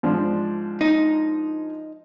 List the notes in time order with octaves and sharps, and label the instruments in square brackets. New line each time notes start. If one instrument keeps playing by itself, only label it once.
[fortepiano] G#2 F3 D4
[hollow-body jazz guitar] D#4